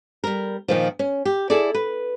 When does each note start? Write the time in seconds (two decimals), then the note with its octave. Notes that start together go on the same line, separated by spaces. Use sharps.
0.24 G3 A#4
0.68 A#2 D#3 F3
0.99 C#4
1.25 G4
1.50 E4 G#4 A4 D5
1.74 B4